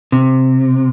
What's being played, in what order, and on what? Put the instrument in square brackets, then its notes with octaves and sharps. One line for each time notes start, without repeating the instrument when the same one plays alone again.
[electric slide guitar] C3